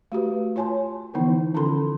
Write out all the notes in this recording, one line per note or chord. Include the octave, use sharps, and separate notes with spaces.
A3 F#4 G4 B4
F4 C#5 G#5 A5 C6
D3 E3 F3 B3 D#4 E4
D3 C#4 F4 A4 B5 C6